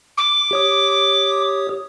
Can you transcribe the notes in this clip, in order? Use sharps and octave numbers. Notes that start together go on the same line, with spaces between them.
D6
G4 C#5 D#6